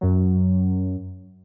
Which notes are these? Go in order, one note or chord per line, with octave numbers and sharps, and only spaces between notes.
F#2 F#3